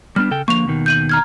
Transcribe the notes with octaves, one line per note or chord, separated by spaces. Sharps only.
G3 B3 D4 F6
C#3 A4 G5
D3 F3 A#3 C#6 F7
D#2 B2 D#3
G6 D#7 F#7
A#5 F6 G#6